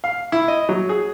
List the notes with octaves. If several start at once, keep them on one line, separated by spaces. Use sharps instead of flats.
F5
E4
D#5
F#3
G#4